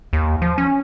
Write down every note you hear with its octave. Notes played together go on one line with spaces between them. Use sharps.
D#2
F3
C#4